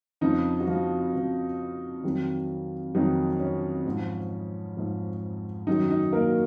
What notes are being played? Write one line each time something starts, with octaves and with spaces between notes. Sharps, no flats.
F2 C#3 F3 D#4
F#4
F3 F4
F2 C#3 F3
F2 D#3 F#3
F2 D#3 F#3 D#4
C#4
G#2 F3
G#2 F3
F#2 D#3 F#3 D#4
D#4
A#3 A#4
F#4